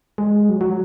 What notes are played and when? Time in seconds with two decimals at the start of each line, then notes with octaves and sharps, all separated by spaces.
0.18 G#3
0.49 F#3
0.61 F#3